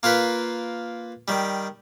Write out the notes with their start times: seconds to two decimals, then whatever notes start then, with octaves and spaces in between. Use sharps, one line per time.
0.03 A#3 F4 A#4 B4
1.28 D#3 G3